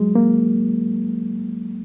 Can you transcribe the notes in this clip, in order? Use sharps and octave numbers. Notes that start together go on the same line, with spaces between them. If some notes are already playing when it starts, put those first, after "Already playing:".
Already playing: F#3 G#3
A#3